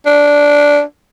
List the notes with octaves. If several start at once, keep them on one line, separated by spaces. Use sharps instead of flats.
D4